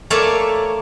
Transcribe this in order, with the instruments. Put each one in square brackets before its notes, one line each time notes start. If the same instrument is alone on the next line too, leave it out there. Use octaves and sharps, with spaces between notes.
[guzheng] A3 A#3 A4 C#5 D5 A5